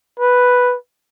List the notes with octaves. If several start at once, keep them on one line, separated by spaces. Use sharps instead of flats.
B4